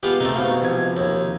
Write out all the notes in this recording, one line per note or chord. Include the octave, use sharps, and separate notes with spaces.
G#3 B3 F4 G4
C3 A3 D#4
G#2 B2 F5
C3 F3 G#6
D#2